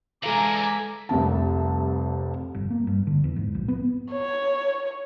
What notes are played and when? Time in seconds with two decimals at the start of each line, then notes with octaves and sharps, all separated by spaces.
0.24 E3 G#3 D4 A4 F5 G#5 A#5 D6
1.09 F1 C2 F2 A5
2.55 G1
2.70 A#3
2.87 G2
3.07 D3
3.24 E2
3.36 G#2
3.55 A#1
3.68 B3
4.12 C#5